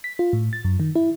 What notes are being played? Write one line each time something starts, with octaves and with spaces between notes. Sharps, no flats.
B6
F4
A2
A6
F#2
D#3
E4